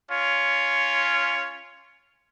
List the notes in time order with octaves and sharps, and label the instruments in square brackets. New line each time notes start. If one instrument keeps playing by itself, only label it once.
[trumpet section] C#4 F4 C#5